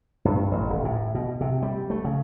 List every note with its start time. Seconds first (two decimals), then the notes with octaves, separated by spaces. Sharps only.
0.25 G2
0.52 A1
0.70 D#1
0.85 A2
1.15 B2
1.41 C3
1.63 G3
1.90 A3
2.05 C#3